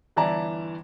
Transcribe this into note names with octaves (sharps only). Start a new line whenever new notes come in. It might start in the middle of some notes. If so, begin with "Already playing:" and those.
G1 E3 E4 D5 A5 A#5